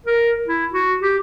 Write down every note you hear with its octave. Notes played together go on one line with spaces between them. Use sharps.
A#4
E4
F#4
G4